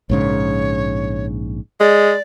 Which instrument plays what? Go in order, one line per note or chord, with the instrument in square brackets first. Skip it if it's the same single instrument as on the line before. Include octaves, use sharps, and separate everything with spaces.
[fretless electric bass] A#1 G#2 C#3 [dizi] C#5
[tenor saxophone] G#3 [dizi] D5